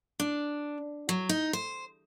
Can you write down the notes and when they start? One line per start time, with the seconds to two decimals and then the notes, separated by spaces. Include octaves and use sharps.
0.20 D4
1.09 F#3
1.29 D#4
1.53 C5